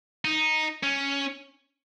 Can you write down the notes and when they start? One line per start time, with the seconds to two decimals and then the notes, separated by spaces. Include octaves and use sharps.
0.25 D#4
0.83 C#4